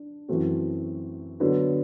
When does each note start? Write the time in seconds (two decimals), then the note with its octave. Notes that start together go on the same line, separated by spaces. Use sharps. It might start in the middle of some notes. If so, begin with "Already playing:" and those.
Already playing: D4
0.28 F#2 E3 A3 C4 F#4
1.40 D3 F#3 B3